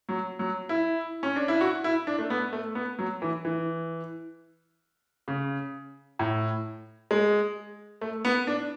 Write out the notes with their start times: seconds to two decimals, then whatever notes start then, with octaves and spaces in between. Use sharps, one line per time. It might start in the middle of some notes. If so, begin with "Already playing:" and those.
0.09 F#3
0.39 F#3
0.69 E4
1.23 C#4
1.36 D4
1.48 E4
1.61 F#4
1.84 E4
2.07 D4
2.19 A3
2.30 B3
2.53 A3
2.75 B3
2.99 F#3
3.22 E3
3.45 E3
5.28 C#3
6.19 A2
7.11 G#3
8.01 A3
8.25 B3
8.47 D4